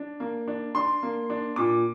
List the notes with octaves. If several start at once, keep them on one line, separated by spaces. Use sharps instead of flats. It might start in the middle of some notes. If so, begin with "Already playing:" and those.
Already playing: D4
A#3
D4
D4 C6
A#3
D4
A#2 D6